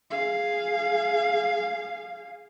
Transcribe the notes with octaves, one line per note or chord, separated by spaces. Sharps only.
G#4 F5